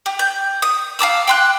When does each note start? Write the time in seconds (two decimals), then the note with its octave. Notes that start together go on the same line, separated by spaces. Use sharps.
0.06 G4
0.19 G6
0.62 D#6
0.99 F5 A5 D6 E6
1.27 G5 C6 F#6